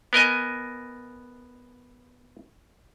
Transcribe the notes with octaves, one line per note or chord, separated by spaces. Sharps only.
B3 A#4 D#5 G#5